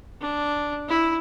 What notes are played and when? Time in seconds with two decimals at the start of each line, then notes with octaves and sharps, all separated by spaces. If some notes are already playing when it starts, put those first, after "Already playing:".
0.21 D4
0.89 E4